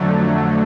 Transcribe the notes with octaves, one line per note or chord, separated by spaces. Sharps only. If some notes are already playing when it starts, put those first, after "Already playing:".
Already playing: F2 D3 F#3 A3